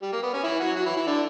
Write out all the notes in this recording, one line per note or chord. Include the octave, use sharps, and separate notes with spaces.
G3
A#3
B3
C#4
E3 E4
F#3 F#4
F#3 F#4
E3 E4
E3 E4
D3 D4